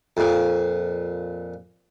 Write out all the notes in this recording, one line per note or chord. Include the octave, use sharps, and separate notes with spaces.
F2 A#2